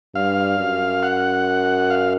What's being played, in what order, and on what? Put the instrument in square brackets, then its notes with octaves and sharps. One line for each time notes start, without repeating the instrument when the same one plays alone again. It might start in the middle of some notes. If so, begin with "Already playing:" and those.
[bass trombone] G2 [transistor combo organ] F5
[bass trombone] F#2
[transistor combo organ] F#5
F5